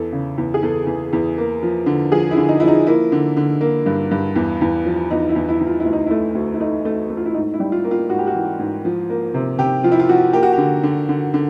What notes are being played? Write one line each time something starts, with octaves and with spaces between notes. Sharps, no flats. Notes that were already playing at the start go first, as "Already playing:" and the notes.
Already playing: E2 A4
C#3
E2
G#4
E2 A4
E2
E2
A#3
F3
D3
F3 G#4
E4
D3
D#4
F3 E4
D#4
A#3 E4
D3
D3
A#3
G2
G2
E2
E2
F3
E2 D#4
E4
E2
E4
E2
F4
E4
D2
D#4
A3 E4
D2
E4
A3 D#4
A3
A3
F4
E4
G#2 D#4
E4
G3
F4
A#3
F4
G#2 F#4
G4
F#4
E3
G#2
F3
A#3
C3
C3 G4
F3 F4
E4
F4
F3 F#4
A#3 G4
F#4
G4
D3
D3
D3
D3